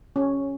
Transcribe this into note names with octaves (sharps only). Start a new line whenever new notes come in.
C#4